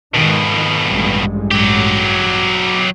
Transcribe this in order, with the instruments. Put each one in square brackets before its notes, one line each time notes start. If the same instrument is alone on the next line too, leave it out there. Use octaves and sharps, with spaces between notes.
[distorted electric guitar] F2 B2 [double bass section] G#2 D#3
[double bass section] A1 G2 G#3
[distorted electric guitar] F#3 G4